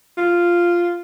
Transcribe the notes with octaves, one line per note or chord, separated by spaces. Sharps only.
F4